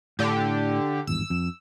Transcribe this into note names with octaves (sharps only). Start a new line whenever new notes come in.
A2 D3 G4
G#1 E2 G2 E6
F2